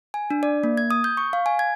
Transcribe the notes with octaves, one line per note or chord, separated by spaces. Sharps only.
G#5
D4
D5
A#3
G#6
D#6
G6
C#6
F5
G#5
G#6